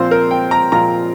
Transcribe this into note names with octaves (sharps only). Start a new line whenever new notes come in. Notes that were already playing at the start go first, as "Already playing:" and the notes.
Already playing: A#2 F3 C4 F4 C5
A#4
G5
A#5
A#2 F3 C4 F4 A#5